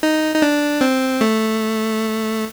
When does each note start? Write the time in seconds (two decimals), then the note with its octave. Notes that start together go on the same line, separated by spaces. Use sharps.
0.03 D#4
0.35 D#4
0.42 D4
0.81 C4
1.21 A3